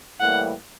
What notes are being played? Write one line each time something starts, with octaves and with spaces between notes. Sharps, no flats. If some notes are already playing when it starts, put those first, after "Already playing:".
A2 E3 G3 A#3 F#5